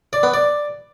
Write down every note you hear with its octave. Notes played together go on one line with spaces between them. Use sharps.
D5
B3
D5